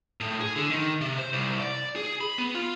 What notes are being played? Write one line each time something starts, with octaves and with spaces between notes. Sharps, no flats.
A2
G#4
D3
D#3
C3
C5
C2
D5
G#4
B5
B3
F4